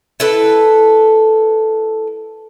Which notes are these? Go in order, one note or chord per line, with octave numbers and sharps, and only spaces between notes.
E4 A4 B4